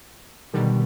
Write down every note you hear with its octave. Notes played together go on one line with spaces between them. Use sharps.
B2 D3 D#3 G3